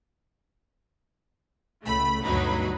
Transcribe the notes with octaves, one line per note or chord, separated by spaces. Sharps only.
C#2 A3 B5
D2 G2 B2 F#3 D#4 B5